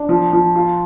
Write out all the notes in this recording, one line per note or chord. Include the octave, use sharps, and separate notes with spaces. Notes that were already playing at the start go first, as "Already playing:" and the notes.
Already playing: D4
F3
F3
F4